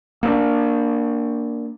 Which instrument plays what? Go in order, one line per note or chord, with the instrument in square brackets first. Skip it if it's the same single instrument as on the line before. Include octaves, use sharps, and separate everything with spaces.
[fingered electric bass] A#3 B3 D4